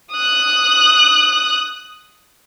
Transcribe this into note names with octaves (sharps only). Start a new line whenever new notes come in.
D#6 F#6